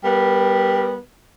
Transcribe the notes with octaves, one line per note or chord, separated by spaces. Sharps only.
G3 B3 A#4